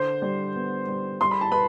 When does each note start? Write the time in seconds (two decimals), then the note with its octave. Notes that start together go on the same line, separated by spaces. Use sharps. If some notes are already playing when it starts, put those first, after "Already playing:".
Already playing: D3 C5 C6
0.22 G3
0.55 B3
0.88 G3
1.21 G3 C6
1.31 B5
1.41 A5
1.51 B4 B5